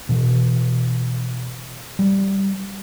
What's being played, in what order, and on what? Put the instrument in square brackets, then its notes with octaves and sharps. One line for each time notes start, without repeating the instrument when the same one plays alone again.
[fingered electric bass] B2 E3
G3